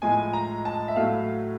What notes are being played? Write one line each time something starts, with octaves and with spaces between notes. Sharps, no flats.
A2 F3 G#3 G#5
A#5
A5
E5
A2 F#3 A3 F5